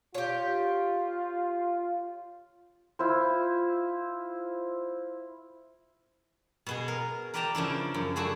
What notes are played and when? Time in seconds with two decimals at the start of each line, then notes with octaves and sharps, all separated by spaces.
0.15 F4 G4 C#5
2.99 E4 F4 C5
6.67 B2 B3 G#4
6.88 A#4
7.34 A#4 B4 D5 G5 A5 A#5
7.55 C#3 F3 D4 E4
7.94 F#2
8.16 A3 D4 F#4 G#4 E5